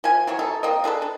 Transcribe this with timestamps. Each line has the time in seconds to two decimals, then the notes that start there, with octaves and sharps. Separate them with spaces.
0.04 F3 G#5
0.27 E3 F#3 C#5
0.39 D#4 A4
0.63 A#3 C4 D#5
0.84 D4 G#4 A4 B4
1.02 D4